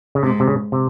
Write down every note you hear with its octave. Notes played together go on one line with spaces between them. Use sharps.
C#3
G#2 C3
C3
C#3
C3